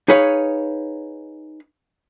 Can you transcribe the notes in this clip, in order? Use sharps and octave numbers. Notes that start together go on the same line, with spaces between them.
D#4 G#4 B4 C#5 F5